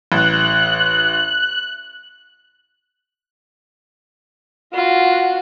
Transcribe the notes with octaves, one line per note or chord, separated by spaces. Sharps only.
A1 F#6
F4 F#4